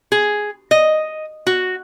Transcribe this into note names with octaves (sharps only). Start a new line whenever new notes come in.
G#4
D#5
F#4